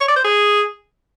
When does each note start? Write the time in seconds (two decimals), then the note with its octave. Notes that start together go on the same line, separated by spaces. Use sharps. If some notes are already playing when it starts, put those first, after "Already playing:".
0.01 C#5
0.08 D5
0.16 C5
0.24 G#4